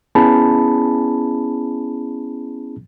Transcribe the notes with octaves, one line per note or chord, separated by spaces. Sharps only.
B3 C#4 E4 G#4 A5 B5